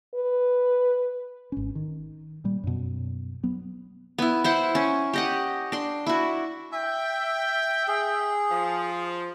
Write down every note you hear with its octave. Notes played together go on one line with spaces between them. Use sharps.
B4
G#1 C#4
D#3
A#2 G3
F#2 B2
F#3 B3
B3 E4
E4 C5 F#5
C#4
G4 D#5 F#5
D4 C6
E4 F#4
E5 G5
G#4
F3